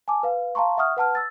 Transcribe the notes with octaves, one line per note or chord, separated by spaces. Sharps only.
G#5 A5 D6
B4 F5
F5 A5 A#5 C6 C#6
E5 F#5 C#6 D#6 F6
B4 F#5 A5 F6
E6 A6